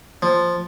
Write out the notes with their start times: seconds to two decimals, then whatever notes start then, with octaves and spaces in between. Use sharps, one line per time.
0.22 F3